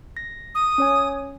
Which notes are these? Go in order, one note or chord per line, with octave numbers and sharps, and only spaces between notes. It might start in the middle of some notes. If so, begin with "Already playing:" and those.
A#6
D#6
C#4 C#5 G#5